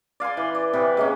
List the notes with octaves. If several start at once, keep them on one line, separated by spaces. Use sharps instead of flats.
D5 F5 G#5 C6
E3
D5
C3 E3 B3
G#3 A#3 C#4